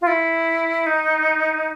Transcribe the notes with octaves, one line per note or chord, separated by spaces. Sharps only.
F4
E4
D#4